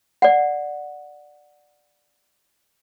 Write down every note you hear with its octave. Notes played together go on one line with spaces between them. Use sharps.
D5 F#5